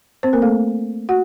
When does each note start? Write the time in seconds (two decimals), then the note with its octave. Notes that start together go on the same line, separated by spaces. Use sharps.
0.23 C4 C5
0.33 A#3 A#4
0.42 A3 A4
1.09 F#4 F#5